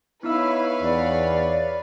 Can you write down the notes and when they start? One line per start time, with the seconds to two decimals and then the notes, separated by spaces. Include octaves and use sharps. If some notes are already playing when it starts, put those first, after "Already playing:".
0.23 B3 D#4 E4 B4 C#5 F5 E6
0.81 E2 D5